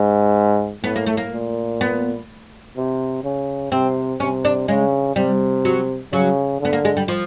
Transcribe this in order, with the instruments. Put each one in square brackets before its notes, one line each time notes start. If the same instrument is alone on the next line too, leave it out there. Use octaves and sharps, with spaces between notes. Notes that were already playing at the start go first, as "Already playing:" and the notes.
Already playing: [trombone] G#2
[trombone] A2 [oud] B3
[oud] A#3
A3
A#3
[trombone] A#2
[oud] B3
[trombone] C3
C#3
[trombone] C3 [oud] C4
[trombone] C3 [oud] C#4
[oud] D4
[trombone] C#3 [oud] G#3
[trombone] C3 [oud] G3
[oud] F#3
[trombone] C#3 [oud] F#3
[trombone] D3 [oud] B3
[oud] A#3
G#3
G3
F3